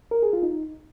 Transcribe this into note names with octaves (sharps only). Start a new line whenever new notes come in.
A#4
G#4
F4
D#4